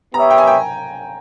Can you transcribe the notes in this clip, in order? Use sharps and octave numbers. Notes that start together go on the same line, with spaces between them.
B3 G4 C#5 E5 A#5
G5
G#5
G5